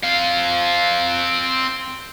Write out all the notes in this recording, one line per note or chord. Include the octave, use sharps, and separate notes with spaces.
C4 F5